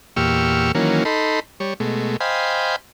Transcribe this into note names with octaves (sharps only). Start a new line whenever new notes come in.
E2 A#2 G4 C#6 E6 F6
D#3 E3 F#3 A#3 C#4
D#4 A4 B5 C6
G3 C#5
B2 G#3 A3
C5 D#5 F5 G5 G#5 B5